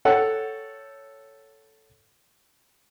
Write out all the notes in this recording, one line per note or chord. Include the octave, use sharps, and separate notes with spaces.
A4 C#5 F#5 G5